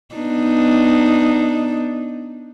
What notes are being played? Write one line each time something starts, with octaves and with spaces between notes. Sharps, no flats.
B3 D4 D#4